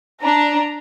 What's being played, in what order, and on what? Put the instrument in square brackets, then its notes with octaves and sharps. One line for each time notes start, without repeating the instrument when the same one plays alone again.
[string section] D4 [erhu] A#5